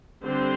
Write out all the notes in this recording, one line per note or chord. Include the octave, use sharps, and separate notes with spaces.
D3 G3 C4 C5